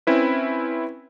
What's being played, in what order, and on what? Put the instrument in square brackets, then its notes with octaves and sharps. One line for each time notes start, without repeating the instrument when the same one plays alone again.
[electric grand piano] C4 C#4 E4 B4